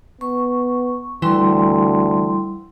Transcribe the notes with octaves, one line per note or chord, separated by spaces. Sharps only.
B3 C#6
D2 E3 G3 E4 C6